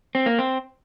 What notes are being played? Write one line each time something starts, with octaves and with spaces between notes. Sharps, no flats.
C4
A#3
C4